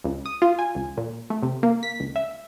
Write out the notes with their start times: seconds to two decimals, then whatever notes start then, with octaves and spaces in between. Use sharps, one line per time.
0.04 C#2
0.26 D#6
0.42 F4
0.59 G#5
0.75 C#2
0.98 A#2
1.30 A3
1.43 C3
1.63 A#3
1.83 B6
2.00 C#2
2.16 E5